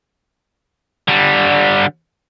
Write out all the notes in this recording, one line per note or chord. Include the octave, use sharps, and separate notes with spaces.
D3 G3